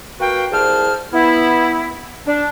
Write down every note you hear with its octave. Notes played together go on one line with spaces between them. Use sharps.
A#3 F#4 B4 F5 G5
C2 G#4 C5 A5 F6
B3 E4
D4